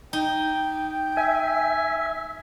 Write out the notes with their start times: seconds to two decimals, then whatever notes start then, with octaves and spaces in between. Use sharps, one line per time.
0.13 D#4 G5
1.17 E5 G#5